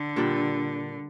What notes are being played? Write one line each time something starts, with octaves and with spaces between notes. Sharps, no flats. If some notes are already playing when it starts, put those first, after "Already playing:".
Already playing: D3
A#2 G3 D4 G4